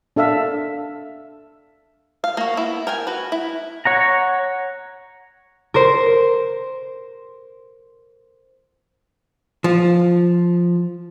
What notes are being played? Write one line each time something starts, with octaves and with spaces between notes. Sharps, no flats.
D4 A4 E5 F5 E6
F5
A#3 F#4
B3 E4
A#4 G5 G#5
F#4 B4
E4
C#5 F#5 A#5
A#4 C5
F3